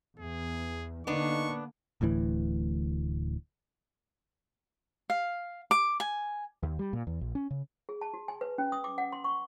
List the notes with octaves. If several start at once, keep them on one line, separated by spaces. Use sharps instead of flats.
E2 G#4
D3 A#3 B3 D4 D#4 C#6
D1 D2 A2 E3
F5
D6
G#5
D#2
G3
A#2
E2
A#1
C#4
C#3
G#4
A5
F#4
G#5
B4
C#4
D#6
D6
F#5
C6
C#6